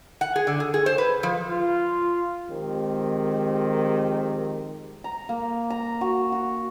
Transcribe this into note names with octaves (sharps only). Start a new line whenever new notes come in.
F#5
G#4
D3
G#4
G#4
C5
B4
F3
F4
D#3 F3 G#3 C4 G4
A#5
A#3
A#5
F#4
F#4